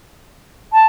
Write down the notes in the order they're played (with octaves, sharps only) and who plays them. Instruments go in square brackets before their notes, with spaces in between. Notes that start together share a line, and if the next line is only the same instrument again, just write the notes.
[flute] A5